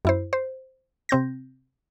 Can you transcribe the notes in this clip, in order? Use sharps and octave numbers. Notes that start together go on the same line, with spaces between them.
F#2 E4 C5
C5
C3 C4 G6 A#6